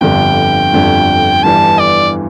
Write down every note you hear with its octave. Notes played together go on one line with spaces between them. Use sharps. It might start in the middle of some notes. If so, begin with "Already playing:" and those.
G1 F2 D3 G3 G5
G1 F2 D3 G3
G1 G2 E3 G3 D4 A5
D5